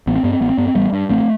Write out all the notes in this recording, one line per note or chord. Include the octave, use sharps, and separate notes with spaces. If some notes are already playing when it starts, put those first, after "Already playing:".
A1 B3
C4
G2 B3
C4
A1 B3
C4
G2 B3
C4
A1 G3 B3
G2
A1 A3 C4